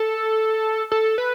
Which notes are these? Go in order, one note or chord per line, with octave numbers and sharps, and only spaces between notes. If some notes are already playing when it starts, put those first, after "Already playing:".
Already playing: A4
A4
B4